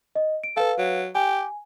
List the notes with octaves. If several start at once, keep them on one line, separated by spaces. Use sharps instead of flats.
D#5
D7
A4 B4 F5
F#3
G4 G#5